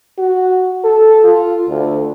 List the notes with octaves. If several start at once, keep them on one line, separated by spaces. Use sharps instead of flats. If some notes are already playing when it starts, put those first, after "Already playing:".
F#4
A4
F4
D2